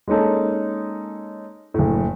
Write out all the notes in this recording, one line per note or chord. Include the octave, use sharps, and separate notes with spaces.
G#3 A#3 C#4 D#4 A4
F#1 A2